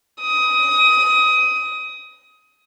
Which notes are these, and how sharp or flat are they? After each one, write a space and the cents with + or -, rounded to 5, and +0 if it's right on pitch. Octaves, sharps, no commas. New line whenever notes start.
D#6 +20